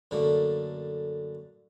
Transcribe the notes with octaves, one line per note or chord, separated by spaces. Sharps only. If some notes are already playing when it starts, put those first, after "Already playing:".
F#2 D3 A3 A#3